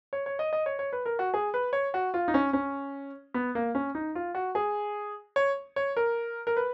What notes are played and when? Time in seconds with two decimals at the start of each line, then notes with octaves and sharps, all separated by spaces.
0.13 C#5
0.26 C#5
0.39 D#5
0.53 D#5
0.66 C#5
0.79 C#5
0.93 B4
1.06 A#4
1.19 F#4
1.34 G#4
1.54 B4
1.73 C#5
1.94 F#4
2.14 F4
2.28 D#4
2.34 C#4
2.53 C#4
3.34 B3
3.55 A#3
3.75 C#4
3.95 D#4
4.15 F4
4.35 F#4
4.55 G#4
5.36 C#5
5.76 C#5
5.97 A#4
6.47 A#4
6.57 B4